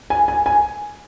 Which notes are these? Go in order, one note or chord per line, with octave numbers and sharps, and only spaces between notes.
G#5
G#5
G#5